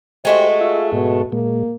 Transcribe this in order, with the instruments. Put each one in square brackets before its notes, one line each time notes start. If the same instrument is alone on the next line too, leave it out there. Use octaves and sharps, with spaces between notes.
[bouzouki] G#3 A3 F#4 [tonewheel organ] G4 C5 [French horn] D#5
[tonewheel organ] F4 E5
[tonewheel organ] G#2 [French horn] B2
[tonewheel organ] A#2 G#3 [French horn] A#3